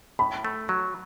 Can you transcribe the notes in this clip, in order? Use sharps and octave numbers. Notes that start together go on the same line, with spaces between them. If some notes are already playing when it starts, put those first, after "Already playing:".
A2 B5
A3
F#3